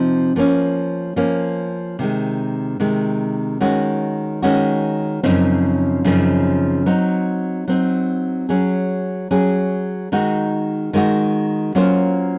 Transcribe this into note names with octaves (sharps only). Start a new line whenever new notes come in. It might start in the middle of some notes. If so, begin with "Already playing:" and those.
Already playing: C3 F3 C4 D#4
F3 A#3 C#4
F3 A#3 C#4
C3 D#3 G#3
C3 D#3 G#3
D#3 G#3 C#4 F#4
D#3 G#3 C#4 F#4
F#2 C#3 F3 C4 D#4
F#2 C#3 F3 C4 D#4
F#3 C4 D#4
F#3 C4 D#4
F#3 C#4 G#4
F#3 C#4 G#4
D#3 G#3 D#4 F#4
D#3 G#3 D#4 F#4
F#3 A#3 C#4 F4 C5